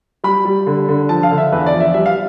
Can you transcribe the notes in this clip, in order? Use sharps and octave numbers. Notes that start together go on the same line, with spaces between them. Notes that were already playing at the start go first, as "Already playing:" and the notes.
G3 B5
G3
D3
D3
F3 A5
F5
D3
E5
E2 B4
D5
F3
E5
G3 E5
F5